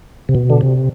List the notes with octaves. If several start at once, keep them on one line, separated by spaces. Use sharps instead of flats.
C3
B2
D3
C3